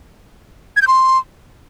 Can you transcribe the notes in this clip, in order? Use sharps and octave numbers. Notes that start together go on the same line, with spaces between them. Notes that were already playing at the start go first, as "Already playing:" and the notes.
G#6
G6
C6